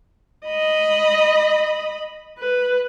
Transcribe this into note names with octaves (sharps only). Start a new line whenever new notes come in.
D#5 B5
B4